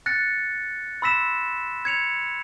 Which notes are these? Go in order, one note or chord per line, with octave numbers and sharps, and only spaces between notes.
F#6 A6 A#6 C#7
B5 C6 E6 A#6 B6 E7
G#6 C#7 F7